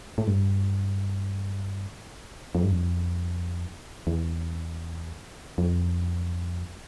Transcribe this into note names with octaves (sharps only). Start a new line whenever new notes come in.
A2
G2
F2
G2
F2
E2
F2